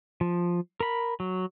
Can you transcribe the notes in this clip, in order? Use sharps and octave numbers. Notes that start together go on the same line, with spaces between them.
F3
A#4 B5
F#3